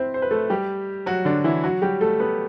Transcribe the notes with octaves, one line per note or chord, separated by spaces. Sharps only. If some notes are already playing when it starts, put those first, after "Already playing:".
Already playing: C4 E4 C5 E5
C5
B4
A3 A4
G3 G4
F#3 F#4
D3 D4
E3 E4
F#3 F#4
G3 G4
A3 A4
B3 B4